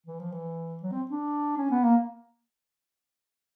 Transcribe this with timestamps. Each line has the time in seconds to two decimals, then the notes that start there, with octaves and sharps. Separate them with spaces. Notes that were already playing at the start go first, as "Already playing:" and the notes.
0.06 E3
0.20 F3
0.32 E3
0.83 F#3
0.92 C4
1.11 D4
1.58 C#4
1.71 B3
1.83 A#3